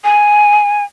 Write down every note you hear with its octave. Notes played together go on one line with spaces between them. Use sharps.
G#5